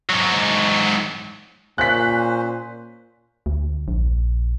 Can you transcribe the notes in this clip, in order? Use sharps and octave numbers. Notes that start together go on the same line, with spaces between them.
G#2 F#3
A#2 C#4 C5 F#6 B6
D2
A#1